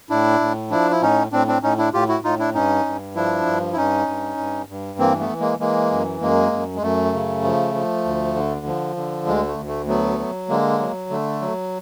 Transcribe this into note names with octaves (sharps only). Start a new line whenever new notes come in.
A2 D4 E4
A2
F3 D4 E4
E4
A2 C#4 D#4
A2 C4 D4
C4 D4
A2 C#4 D#4
D4 E4
A2 F4 G4
E4 F#4
A2 D#4 F4
D4 E4
G2 C#4 D#4
G2
F3 D4 E4
G2
E4
G2 C#4 D#4
G2
G2
G2
E3 A#3 C4
A3 B3
E3
G#3 A#3
E3 G#3 A#3
F#2
F#2 G#3 A#3
F#2
G#3
F#2 A3
C#3
F3
F3
D2
D3
F3
D3
D2 G#3
A3
D2
A3
F#3 A3 B3
F#3
D3 G#3 A#3
F#3
D3 A3
F#3